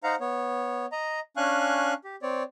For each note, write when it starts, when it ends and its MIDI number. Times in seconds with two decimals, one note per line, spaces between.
0.04 0.15 63
0.04 0.15 72
0.04 0.15 77
0.04 0.15 78
0.04 0.15 82
0.20 0.86 59
0.20 0.86 73
0.92 1.20 75
0.92 1.20 82
1.37 1.94 61
1.37 1.94 62
1.37 1.94 77
1.37 1.94 80
1.37 1.94 85
1.37 1.94 90
2.04 2.16 67
2.22 2.43 60
2.22 2.43 73
2.22 2.43 74